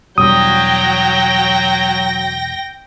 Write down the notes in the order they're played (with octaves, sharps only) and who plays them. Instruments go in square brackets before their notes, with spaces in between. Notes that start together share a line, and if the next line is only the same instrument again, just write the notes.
[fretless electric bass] E1 G3 [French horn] F#3 [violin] G5 A#6 [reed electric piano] D#6